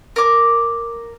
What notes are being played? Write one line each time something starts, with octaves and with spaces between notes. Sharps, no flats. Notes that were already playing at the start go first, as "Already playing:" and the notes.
A#4 D6